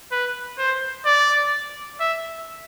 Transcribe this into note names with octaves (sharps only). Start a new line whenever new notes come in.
B4
C5
D5
E5